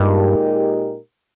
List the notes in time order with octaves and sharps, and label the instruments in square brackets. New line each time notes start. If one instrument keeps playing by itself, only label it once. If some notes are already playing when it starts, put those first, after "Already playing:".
Already playing: [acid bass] G2 [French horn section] A#2 G#3 D#4 G4 A#4